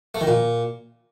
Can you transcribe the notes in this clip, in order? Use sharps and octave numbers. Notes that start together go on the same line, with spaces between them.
A3
D#3
A#2